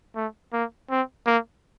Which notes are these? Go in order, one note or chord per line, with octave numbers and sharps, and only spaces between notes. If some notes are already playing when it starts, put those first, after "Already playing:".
A3
A#3
C4
A#3